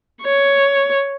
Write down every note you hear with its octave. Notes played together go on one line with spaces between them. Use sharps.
C#5